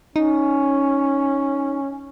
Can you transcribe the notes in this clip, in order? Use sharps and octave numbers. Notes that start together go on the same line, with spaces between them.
C#4 D#4